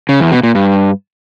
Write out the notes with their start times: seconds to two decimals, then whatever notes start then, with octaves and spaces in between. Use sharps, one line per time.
0.09 C#3
0.20 E2
0.32 B2
0.43 A#2
0.55 G2